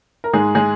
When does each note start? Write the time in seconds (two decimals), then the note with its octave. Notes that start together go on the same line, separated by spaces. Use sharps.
0.24 A#4
0.33 G#2 G#3 G#4
0.55 G#3 G#4